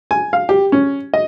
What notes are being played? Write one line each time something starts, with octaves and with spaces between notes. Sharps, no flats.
G#5
F5
G4
C#4
D#5